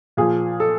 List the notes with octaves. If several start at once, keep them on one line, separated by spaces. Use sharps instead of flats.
A#2 F3 G#4
A4